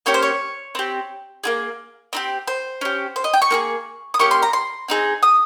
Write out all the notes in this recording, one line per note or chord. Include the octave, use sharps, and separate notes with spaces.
A#3 C#4 G4 C#5
C5
C#5
C4 G4
A#3 F4 G#4
C4 D#4 G4
C5
C#4 G4
C5
D#5
G5
C#6
A#3 F4 G#4
D#6
A#3 C#4 G4 C#6
C6
A#5
C6
C4 D#4 G#4
D#6